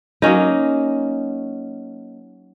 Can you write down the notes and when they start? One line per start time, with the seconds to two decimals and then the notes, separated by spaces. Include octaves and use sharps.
0.22 F#3 A#3 C#4 D#4